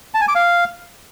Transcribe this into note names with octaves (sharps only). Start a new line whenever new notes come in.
A5
G#5
D6
F5